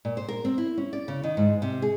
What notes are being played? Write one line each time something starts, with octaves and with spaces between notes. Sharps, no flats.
A#2
C5
A#4
C4
E4
C#4
D5
C#3
D#3
G#2
C3
G#4